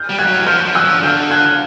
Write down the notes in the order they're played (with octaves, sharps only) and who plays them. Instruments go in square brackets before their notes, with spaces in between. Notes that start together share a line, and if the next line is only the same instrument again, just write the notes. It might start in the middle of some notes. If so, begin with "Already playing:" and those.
Already playing: [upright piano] F6 G6
[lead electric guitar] G3
[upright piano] F#6 G#6
[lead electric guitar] F#3
E3
[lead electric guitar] F3 [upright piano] F6 G6
[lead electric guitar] F3
[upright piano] E6 F#6
[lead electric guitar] F3
[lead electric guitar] D3 [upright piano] F6 G6
[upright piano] F#6 G#6